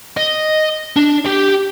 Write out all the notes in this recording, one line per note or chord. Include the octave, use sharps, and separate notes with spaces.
D#5
D4
G4 G5